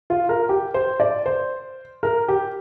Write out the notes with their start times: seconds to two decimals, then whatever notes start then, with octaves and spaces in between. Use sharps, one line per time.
0.10 F4
0.29 A#4
0.49 G4
0.74 C5
1.00 D5
1.26 C5
2.03 A#4
2.28 G4